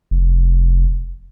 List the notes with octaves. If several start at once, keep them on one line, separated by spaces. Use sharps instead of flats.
F1